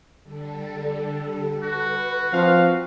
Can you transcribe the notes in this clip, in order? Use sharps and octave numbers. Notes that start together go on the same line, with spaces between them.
D3 G3 A4
F#4 B4
F3 C4 F5